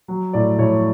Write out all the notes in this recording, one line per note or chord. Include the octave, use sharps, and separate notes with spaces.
F#3
A2 D5
A2 C#5